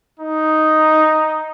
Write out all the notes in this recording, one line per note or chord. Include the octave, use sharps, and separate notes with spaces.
D#4